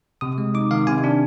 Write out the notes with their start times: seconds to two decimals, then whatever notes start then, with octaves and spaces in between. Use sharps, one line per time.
0.21 C3 D#6
0.38 G#3
0.54 D#4 D6
0.71 D#3 F5
0.87 C3 G#5
1.04 D4